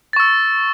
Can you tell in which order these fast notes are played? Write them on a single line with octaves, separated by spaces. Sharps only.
A6 C#6 E6